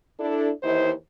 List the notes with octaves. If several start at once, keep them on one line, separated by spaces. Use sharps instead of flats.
D4 E4 A4
D#2 E3 D#4 E4 C5